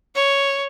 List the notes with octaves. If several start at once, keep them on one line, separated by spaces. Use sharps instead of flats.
C#5